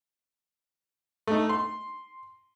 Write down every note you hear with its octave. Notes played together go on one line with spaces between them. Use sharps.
A3 D#4
C6